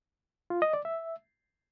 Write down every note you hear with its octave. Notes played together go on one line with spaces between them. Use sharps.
F4
D#5
D5
E5